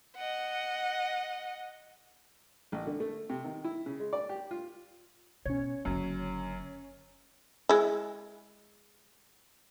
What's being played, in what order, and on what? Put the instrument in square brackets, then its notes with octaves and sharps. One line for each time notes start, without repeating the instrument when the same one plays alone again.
[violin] D#5 F#5
[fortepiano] A1
D3
A3
C3
D#3
E4
C#3
G#3
D5
G4
F4
[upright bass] B2 [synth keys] C#4 C#5
[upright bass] F#1 D3 [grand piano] F#2
[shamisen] G#3 E4